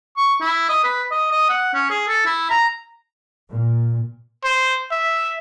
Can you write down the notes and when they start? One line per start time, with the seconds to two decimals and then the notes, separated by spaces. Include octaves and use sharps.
0.17 C#6
0.41 E4
0.69 D#5
0.84 B4
1.11 D#5
1.31 D#5
1.50 F#5
1.74 C#4
1.90 G#4
2.08 A4
2.26 E4
2.50 A#5
3.50 A#2
4.44 C5
4.92 E5